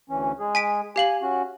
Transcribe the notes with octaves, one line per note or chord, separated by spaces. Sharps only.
D2 E3 C#4
G#3 G#4
G#5 B6 D7
G4 F5 G#5 F#7
C#4 F#4